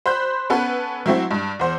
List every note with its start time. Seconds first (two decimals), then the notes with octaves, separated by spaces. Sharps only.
0.06 C5 B5 F#6 G6
0.50 B3 C#4 A4 B4
1.06 F#3 A3 C4 E4
1.31 G2
1.60 E2 C5